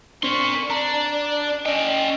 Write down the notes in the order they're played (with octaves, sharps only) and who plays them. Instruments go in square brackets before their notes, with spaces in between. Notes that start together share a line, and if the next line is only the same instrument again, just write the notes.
[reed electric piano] C4 D4 [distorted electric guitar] A#4 C6 [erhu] C#6
[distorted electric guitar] D4 [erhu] D5 [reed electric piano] A#5
[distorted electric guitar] C#4 G5 [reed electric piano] D#5